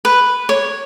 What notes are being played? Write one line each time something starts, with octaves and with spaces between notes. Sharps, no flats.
B4
C#5